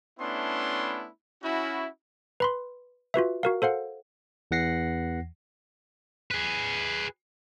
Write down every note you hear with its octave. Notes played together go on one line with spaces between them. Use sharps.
A3 B3 C#4 D4 E4 C6
C#4 E4 F#4
B4 B5 C6
F4 F#4 B4 E5
F#4 A#4 F5
A4 C5 F5 F#5
E2 E3 F#5 A#6 C7
G#4 B4